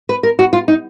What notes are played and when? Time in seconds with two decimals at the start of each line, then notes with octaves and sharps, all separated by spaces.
0.09 B4
0.23 A#4
0.39 F#4
0.53 F4
0.68 D#4